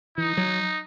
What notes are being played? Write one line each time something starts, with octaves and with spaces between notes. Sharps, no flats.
E3 D#4
F#3